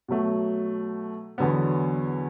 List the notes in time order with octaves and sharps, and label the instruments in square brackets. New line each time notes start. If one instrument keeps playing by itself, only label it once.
[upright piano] B2 F#3 A3
E2 D3 F#3 B3